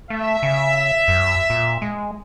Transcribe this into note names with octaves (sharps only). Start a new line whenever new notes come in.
A3 E5
C#3
F#2
A#2
G#3